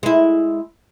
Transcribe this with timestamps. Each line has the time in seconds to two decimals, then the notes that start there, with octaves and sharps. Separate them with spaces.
0.03 G#3 E4